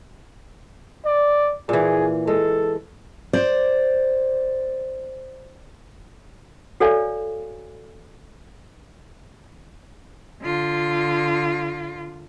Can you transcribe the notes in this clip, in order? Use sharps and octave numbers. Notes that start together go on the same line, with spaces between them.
D5
A#2 E3 G#4
G#3 A4
C5 D5
F#4 A4 C#5 D5 F5 G#5
D3 F4